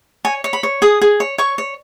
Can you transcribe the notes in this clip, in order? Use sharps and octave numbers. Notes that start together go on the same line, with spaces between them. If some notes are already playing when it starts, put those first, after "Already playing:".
C#5 G#5
C#5
B5
C#5
G#4 D#6
G#4
C#5
C#5 C#6
C#5